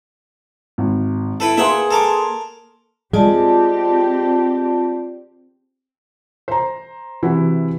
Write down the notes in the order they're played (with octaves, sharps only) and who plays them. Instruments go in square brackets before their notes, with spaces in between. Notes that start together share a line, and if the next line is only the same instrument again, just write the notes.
[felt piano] G#1
[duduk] E4 [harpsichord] A4 B4 G5
[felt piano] A#3 B4 C6 [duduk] G#4 [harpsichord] E5 F#5 G5
[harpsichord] A4 A#4 D6
[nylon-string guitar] G#3 [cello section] C4 G4 [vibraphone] F4 D5 A5
[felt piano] C5 A#5
C3 E3 E4 F#4